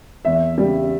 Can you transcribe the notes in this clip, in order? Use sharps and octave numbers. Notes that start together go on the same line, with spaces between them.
E2 E5
C#3 G3